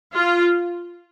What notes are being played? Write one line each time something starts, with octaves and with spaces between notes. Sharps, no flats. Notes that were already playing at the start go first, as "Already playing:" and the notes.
F4